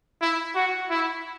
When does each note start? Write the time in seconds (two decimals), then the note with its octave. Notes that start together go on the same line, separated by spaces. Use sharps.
0.21 E4
0.55 F#4
0.90 E4